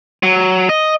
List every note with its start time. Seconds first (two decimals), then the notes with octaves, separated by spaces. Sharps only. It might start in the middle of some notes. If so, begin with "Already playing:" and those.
0.23 F#3
0.69 D#5